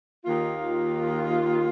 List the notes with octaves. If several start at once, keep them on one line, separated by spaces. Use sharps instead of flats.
D#2 D#3 A#3 F4